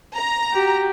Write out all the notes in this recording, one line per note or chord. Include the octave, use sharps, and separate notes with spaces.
A#5
F#4 G4